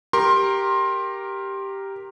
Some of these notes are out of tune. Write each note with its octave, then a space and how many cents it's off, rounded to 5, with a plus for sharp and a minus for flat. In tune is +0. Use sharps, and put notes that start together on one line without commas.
G4 +0 A#4 +0 C6 +20